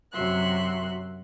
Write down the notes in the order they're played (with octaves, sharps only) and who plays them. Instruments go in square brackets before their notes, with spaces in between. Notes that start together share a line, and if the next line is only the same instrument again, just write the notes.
[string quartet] F#2 C3 F#4 E5 C6 F#6